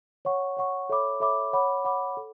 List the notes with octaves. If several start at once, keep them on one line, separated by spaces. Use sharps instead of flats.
C#5 F#5 C#6
C#5 F#5 C#6
A4 C#5 E5 B5 D6
A4 C#5 E5 B5 D6
C#5 F#5 B5 D6
C#5 F#5 B5 D6
A4